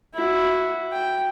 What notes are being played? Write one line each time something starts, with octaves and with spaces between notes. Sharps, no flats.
E4 F#4
G5